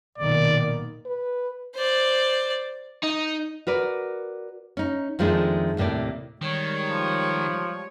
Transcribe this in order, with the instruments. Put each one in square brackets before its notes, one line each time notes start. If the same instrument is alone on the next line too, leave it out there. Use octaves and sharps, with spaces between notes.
[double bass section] B1 A#2 D#3 [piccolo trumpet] D5
[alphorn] B4
[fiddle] C5 D5
[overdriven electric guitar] D#4
[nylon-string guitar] F#4 A#4 B4 D5
C#4 D#4
F2 D#3 F3 G#3 A3 D4
D#2 A2 C3 A#3 D5
[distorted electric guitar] D#3 [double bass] G3 G#3 [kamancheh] C#5
[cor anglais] F3